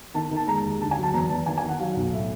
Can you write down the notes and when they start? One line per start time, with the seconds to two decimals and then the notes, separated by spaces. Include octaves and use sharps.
0.14 D#3 A5
0.31 D#3
0.36 A5
0.48 G#3 A#5
0.65 D#2
0.81 D2 A5
0.91 G#5
0.97 F#3
1.03 A5
1.14 E2 A#5
1.30 E2 A5
1.46 D#3 G#5
1.58 G#5
1.63 D#3
1.69 F#5
1.79 F#3 F5
1.96 B1
2.12 A2 E5